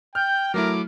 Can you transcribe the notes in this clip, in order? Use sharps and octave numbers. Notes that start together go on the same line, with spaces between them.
G5 F6 G6
F#3 A3 E4 A#4 D6